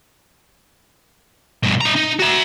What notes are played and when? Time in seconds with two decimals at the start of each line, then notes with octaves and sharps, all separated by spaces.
1.63 G2 B2
1.81 D4 A#5
1.95 D#4
2.19 F#4 E5